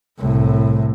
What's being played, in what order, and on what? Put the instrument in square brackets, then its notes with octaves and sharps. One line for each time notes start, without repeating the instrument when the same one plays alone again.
[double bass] C2 A2